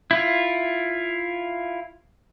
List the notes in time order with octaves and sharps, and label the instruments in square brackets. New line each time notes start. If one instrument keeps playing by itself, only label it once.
[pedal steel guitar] E4 F4